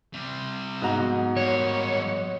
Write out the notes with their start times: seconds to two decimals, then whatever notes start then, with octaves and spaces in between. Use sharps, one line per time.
0.13 C3 G3
0.82 G#2 B2 F#5 A#5
1.37 G3 A#3 C#5